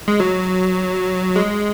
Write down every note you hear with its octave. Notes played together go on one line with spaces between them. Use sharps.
G#3
F#3
G#3